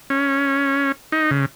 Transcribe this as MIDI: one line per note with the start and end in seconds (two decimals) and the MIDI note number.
0.10 0.92 61
1.12 1.31 63
1.31 1.46 49